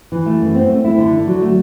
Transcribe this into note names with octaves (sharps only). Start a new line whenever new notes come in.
E3
A3
F#2
C4
A3
E4
D3
D3
F#3
A3